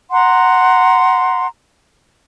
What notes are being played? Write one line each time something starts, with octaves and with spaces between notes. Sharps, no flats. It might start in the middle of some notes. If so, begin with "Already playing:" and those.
F#5 A#5 C6